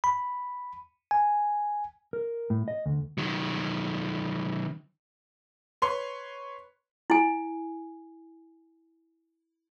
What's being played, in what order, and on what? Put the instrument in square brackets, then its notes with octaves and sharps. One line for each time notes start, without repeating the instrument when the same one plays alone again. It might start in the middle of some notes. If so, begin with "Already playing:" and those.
[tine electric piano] B5
G#5
[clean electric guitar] A#4
A2
D#5
D2
[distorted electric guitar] D#3 F#3
[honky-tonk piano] B4 C#5 C6
[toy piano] E4 G#5